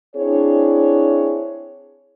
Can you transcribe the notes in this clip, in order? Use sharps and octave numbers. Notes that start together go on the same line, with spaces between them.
C4 D4 E4 G#4 C#5